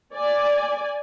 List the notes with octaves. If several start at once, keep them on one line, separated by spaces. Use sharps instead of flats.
D5 G#5